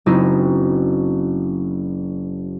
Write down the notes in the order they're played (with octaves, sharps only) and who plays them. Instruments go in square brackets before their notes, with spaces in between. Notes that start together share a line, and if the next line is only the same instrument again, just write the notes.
[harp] F#1 C4 D#4 E4